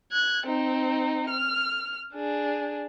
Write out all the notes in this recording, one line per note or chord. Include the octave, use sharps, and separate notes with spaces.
F#6 G#6
C4 D#4
F6
D4 G#4